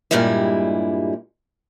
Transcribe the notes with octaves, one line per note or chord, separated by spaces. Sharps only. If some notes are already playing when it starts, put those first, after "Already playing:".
G2 A#2 G3 G#3 E4